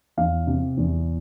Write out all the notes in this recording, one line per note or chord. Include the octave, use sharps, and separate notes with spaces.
E2 F5
C3
E2